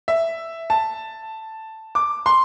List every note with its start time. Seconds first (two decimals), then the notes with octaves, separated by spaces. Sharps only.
0.08 E5
0.70 A5
1.95 D6
2.26 C6